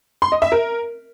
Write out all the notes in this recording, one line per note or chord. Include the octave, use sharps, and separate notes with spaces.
C6
D#5
E5
A#4